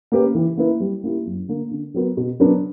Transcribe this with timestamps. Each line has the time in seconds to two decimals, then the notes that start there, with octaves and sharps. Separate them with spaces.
0.12 A#3 C#4 G4 B4
0.35 E3
0.57 A#3 E4 B4
0.80 G3
1.03 A#3 E4 G4
1.26 F#2
1.48 D3 A#3
1.71 D3
1.94 F#3 B3 F#4 A#4
2.17 B2
2.40 F#3 B3 D4 A#4